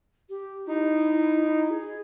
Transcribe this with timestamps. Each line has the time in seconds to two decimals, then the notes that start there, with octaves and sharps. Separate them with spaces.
0.29 G4
0.67 D#4 E4
1.45 E4
1.70 G#4